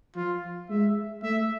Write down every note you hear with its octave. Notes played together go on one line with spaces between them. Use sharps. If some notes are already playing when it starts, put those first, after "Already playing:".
F3 F4
G#3 E5
A3 E5